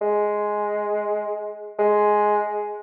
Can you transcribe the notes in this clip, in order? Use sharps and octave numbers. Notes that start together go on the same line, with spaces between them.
G#3
G#3